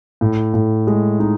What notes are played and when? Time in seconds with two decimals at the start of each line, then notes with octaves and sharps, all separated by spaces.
0.21 A2
0.54 A2
0.87 G#3
1.20 D#4